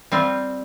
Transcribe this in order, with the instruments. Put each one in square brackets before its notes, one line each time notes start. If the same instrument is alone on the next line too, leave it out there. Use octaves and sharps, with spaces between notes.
[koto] G3 C4 F4